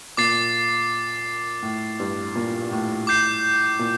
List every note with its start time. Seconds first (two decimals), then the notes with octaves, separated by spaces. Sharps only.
0.17 A#2 D6 A6 C7
1.62 A2
1.99 G2
2.35 A#2
2.71 A2
3.07 D6 G6 C7
3.79 A#2